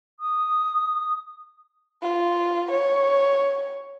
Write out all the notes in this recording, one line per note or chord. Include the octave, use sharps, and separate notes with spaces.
D#6
F4
C#5